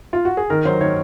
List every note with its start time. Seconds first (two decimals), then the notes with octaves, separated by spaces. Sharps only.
0.13 F4
0.25 F#4
0.37 G#4
0.50 D#3 A#4
0.65 F#3 C5
0.81 D#3 C#5